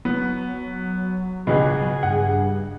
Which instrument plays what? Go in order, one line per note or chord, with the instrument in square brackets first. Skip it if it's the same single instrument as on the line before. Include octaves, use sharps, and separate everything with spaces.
[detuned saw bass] F#3 [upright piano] B3
[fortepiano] C#2 B2 [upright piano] B3 [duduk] G#4
[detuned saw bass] G2 [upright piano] F#5